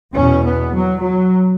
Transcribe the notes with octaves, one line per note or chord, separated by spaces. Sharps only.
E2 B2 C#4
B3
F#3
F#3